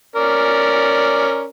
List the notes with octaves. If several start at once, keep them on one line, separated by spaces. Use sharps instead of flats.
C#4 A#4 D5